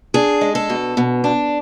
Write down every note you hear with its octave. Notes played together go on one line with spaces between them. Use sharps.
D4 G#4
G#3
A4
B2
B2
D4